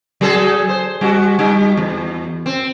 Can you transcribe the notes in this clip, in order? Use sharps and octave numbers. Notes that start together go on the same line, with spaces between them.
F#3 G#4 A4
C5
G3 F#4
G3 D#4
E2
C4